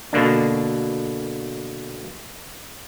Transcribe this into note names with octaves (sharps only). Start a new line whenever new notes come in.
B2 D3 A#3 D4